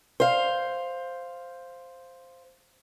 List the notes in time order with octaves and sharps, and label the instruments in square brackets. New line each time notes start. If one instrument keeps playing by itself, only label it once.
[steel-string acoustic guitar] C5 F5